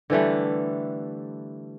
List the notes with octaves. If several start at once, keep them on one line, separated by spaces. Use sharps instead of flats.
D3 E3 G3 A3